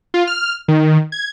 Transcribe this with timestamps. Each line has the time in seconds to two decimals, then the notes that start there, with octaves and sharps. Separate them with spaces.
0.14 F4
0.27 F6
0.68 D#3
1.12 G#6